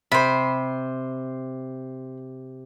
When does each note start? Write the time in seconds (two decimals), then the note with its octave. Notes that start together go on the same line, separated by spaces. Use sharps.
0.12 C3 C5 B5